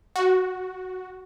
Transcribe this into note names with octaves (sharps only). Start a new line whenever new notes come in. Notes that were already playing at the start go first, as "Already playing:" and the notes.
F#4